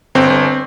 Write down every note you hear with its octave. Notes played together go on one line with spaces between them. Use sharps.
G1 C4
G1